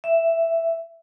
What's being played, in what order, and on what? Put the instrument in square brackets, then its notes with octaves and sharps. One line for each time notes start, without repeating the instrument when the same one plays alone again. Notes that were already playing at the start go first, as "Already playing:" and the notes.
[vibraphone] E5